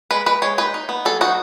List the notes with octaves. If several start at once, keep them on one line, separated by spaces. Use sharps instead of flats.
G#3 B4
G#3 B4
G#3 C#5
D#4 B4
D#4
B3
F#3 A4
D#4 F#4